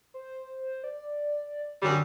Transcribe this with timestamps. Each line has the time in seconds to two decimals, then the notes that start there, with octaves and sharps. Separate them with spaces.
0.14 C5
0.84 D5
1.82 F#2 D3 F#3 G3